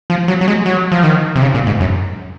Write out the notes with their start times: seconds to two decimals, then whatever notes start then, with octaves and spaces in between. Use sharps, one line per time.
0.10 F3
0.28 F#3
0.41 F#3
0.48 G#3
0.66 F#3
0.92 F3
1.03 D#3
1.36 C3
1.42 C#3
1.54 A#2
1.67 G#2
1.80 F#2